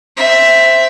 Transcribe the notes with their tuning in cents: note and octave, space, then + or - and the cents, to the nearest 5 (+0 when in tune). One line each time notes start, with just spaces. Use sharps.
C4 +0 E5 +5